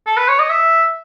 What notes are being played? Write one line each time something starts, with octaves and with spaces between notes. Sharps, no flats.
A4
B4
C#5
D#5
E5